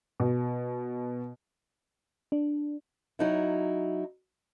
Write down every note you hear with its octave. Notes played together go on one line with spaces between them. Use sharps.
B2
D4
F#3 D#4 E4